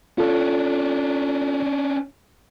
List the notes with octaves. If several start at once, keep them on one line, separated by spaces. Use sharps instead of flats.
C#4 D4 F4 A4